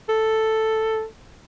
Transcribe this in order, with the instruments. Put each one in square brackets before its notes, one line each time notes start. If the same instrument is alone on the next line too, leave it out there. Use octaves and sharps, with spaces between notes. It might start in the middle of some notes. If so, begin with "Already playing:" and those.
[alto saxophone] A4